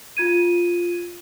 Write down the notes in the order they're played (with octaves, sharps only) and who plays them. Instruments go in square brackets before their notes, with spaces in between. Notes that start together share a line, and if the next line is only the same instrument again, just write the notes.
[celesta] F4 G#6 D#7